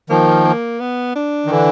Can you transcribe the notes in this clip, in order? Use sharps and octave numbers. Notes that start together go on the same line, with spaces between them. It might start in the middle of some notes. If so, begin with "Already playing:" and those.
D#3 F3 A#3
A#3
B3
D4
D#3
D3 E3